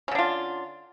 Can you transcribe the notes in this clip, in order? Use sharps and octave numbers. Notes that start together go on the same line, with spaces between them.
D3 C#4 D4 F4